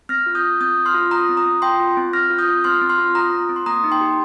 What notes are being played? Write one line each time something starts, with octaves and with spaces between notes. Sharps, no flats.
C4 F6 A#6
F4
D#6 G6
F4
C4 D#6 G6
C4
C6 F6
F4
F4 A#5 D#6
C4
A#5 D#6
C4
F4 G5 C6
F4
C4
C4 F6 A#6
F4
D#6 G6
F4
C4 C6 F6
C4
C6 F6
F4
F4 A#5 D#6
C4
C4
C6
A#3 A#5 D#6
D#4
G5 C6
G4